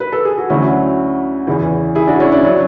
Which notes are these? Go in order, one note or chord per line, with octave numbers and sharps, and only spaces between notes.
B4
A4
G#4
F#4
D2 D3 F#3 C#4 E4
E2 C#3 E3
E4 G#4
D4 F#4
C#4 E4
D4
F#3 C#4